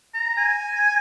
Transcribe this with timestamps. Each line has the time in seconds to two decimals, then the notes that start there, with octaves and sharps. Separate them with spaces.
0.14 A#5
0.38 G#5